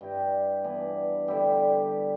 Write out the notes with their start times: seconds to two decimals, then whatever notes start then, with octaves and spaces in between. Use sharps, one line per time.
0.01 G2 G3 E4 G4
0.64 E3 B3 D4
1.28 D3 G3 E4 G4